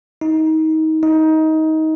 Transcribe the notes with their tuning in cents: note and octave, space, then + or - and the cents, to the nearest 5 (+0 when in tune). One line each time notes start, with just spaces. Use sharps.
D#4 +25
D#4 +20